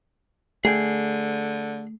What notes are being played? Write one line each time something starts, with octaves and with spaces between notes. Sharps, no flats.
D3 A3 G#4 G5